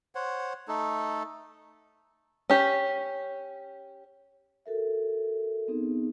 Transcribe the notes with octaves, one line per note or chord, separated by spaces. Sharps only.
C5 C#5 F#5
A3 D#4 A4
C#4 G4
F#4 A4 A#4 E5
B3 C4 D#4 G#4